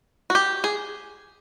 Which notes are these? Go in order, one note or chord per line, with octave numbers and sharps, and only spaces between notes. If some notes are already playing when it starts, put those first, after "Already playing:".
F#4
G4
G#4